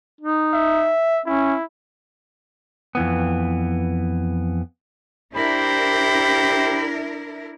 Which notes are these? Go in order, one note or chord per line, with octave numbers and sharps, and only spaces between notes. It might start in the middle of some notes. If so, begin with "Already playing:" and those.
D#4
E5
C#4 E4
F2 E3 B3
D4 E4 G4 A#4 C5 B5